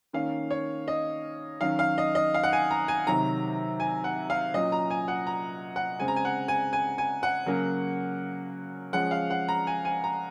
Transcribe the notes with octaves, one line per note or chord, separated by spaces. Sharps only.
D#3 A#3 C#4 F5
C#5
D#5
D#3 F#3 C#4 F5
F5
D#5
D#5
F5
F#5
G#5
A#5
G#5
C3 D#3 F#3 A#5
G#5
F#5
F5
A#2 F#3 C#4 D#5
A#5
G#5
F#5
A#5
F#5
C#3 G#3 C4 G#5
A#5
G#5
F#5
G#5
G#5
G#5
F#5
C#3 F#3 A#3 C#4
F3 G#3 C#4 F#5
F5
F#5
A#5
G#5
G#5
A#5